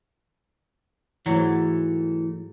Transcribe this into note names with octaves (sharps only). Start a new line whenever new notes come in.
G#2 E3 F#3 A3